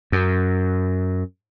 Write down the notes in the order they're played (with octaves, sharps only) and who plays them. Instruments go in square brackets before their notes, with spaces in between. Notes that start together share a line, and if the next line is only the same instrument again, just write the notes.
[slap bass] F#2